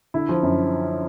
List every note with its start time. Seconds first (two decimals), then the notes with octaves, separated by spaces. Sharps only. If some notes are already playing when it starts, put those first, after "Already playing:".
0.14 D3 E4
0.29 F3
0.43 F#2